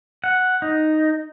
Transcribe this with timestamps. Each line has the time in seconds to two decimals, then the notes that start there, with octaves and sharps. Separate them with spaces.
0.24 F#5
0.62 D#4